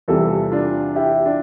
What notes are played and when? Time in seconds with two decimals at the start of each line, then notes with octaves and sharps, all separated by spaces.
0.08 E2 C3 E3 G3 F4 A4
0.52 D4 F4
0.96 E4 G4
1.25 D4 F4